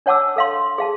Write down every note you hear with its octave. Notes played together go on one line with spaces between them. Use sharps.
D4 C#5 F#5 A5 D6 E6
A4 F5 C6
G#4 F5 A5